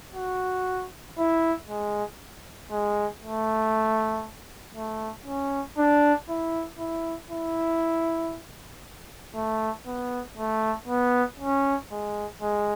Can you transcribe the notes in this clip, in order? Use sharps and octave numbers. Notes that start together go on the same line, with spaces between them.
F#4
E4
G#3
G#3
A3
A3
C#4
D4
E4
E4
E4
A3
B3
A3
B3
C#4
G#3
G#3